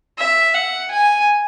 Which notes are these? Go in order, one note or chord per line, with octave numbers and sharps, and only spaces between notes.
E5
F#5
G#5